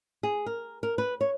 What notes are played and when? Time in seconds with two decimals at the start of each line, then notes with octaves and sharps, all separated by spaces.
0.23 G#4
0.46 A#4
0.83 A#4
0.98 B4
1.21 C#5